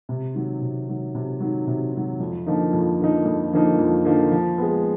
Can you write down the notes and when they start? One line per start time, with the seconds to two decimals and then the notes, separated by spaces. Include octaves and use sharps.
0.09 C3
0.34 D#3 F#3
0.61 C3
0.88 D#3 F#3
1.15 C3
1.40 D#3 F#3
1.67 C3
1.94 D#3 F#3
2.20 F2
2.47 D3 F3 A#3 D#4
2.73 F2
2.99 D3 F3 A#3 D#4
3.26 F2
3.52 D3 F3 A#3 D#4
3.79 F2
4.05 D3 F3 A#3 D#4
4.32 F3
4.58 G#3 B3